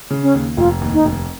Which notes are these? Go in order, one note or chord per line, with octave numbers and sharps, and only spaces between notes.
C#3
C#4
D#2
F1 F4
D#2
D#4
F1